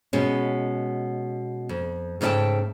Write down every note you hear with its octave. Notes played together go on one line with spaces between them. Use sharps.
B2 G#3 C#4
F2
G#2 C#3 A3 D#5 G5 A5